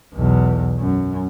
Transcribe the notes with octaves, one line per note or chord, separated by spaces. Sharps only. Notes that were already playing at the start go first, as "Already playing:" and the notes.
B1 E2
F#2